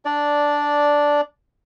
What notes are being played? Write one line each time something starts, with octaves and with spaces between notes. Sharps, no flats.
D4 D5